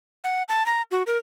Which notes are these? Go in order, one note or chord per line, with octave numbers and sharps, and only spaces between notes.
F#5
A5
A#5
F#4
A#4